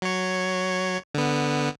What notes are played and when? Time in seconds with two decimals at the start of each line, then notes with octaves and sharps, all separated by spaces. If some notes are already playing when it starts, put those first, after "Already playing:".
0.02 F#3 C#5
1.14 D3 B3